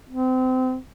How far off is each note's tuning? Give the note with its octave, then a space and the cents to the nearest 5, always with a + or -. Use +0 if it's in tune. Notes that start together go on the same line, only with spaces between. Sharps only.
C4 -30